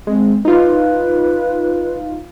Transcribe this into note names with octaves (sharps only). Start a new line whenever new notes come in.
G#3 C4
D#4 F4 B4